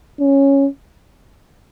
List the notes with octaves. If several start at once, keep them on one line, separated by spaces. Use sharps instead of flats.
C#4